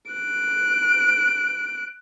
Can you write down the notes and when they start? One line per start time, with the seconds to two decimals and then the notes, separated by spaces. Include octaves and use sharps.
0.12 F#6 D7